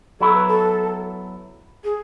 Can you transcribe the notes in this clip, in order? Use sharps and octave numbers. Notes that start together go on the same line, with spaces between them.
F#3 B3 E4 A4
B4
A4
G#4